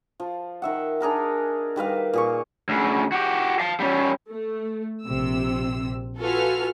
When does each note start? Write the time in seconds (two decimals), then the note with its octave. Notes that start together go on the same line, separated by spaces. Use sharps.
0.20 F3
0.62 D#3 E5 F#5
1.00 D4 G#4 A#4 B5
1.76 D#3 G3 B4 F5
2.13 A#2 G#4 C#6
2.69 D2 C#3
3.12 F#4 G4
3.60 F5 A5
3.80 G3 C#4
4.31 A3
5.05 A#1 C3 E6
6.19 F4 F#4 A4 B4 G#5 F6